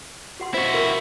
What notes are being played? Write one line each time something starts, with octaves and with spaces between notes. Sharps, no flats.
G4 F#5 C6
E4 F#4 C5
A#4 F5 C6